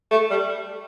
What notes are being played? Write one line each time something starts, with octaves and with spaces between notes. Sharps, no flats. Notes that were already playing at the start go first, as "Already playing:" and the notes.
A3
G3